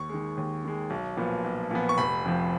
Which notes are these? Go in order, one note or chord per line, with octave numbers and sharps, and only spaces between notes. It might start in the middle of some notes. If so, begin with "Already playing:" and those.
Already playing: D#2 C#6
D#3 G#3
D#2
D#3 G#3
B1
A#2 F3 B3
B1
A#2 F3 B3
C#6
F1 B5
F2 F3